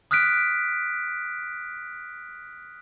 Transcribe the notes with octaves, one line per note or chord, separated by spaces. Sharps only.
D#6 F6 F#6 B6 D7